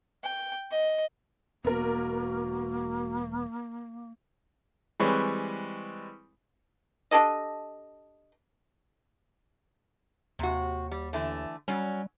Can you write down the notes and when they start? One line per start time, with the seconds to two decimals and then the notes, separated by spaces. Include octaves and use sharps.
0.24 G5
0.71 D#5
1.65 E1 A#3 B3 F#4 A#4
5.00 E3 G3 G#3 C4 B4 C#5
7.11 D4 G4 A4 D#5
10.39 D#2 C3 F#4
10.91 G3
11.13 D3 E3 A3
11.68 F#3 G3 C#4